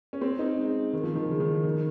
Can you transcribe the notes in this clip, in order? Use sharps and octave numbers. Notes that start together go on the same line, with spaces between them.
C#4
C4
D#4
G#3
D#3
F3
D#3
C#3
D#3
F3
D#3